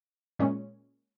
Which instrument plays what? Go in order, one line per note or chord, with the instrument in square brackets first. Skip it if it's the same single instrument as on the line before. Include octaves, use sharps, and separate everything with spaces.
[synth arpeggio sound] A#2 G#3 C#4